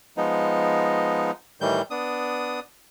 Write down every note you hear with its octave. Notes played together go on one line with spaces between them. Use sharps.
F3 G#3 B3 D#4
A2 D#3 E3 G3 G6
B3 D4 D#6